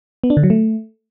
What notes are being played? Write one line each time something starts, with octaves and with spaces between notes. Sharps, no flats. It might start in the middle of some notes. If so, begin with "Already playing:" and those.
B3
D4
D3
F#3
A3